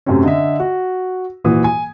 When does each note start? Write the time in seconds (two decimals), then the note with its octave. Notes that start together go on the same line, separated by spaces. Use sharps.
0.06 F#2 C3 A3 C4 C#4
0.23 D3 D#5 E5
0.60 F#4
1.44 D#1 A#2 E3 F#4 D#6
1.64 G#5